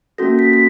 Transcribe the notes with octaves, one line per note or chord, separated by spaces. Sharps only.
A#3 C#4 F#4 A4 A#6
B6
B6